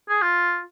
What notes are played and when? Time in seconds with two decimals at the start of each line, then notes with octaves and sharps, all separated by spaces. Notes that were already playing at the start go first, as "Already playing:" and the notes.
0.09 G#4
0.22 F4